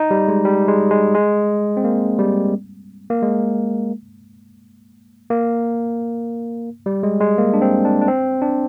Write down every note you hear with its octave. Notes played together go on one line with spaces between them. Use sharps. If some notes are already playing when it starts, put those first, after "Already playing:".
Already playing: D#4
G3
G#3
G3
G#3
G#3
G#3
C4
A#3
G3
A#3
G#3
A#3
G3
G#3
G#3
A#3
D4
C4
D4
D4
C4
D4